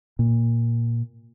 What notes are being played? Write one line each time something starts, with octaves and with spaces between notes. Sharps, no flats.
A#2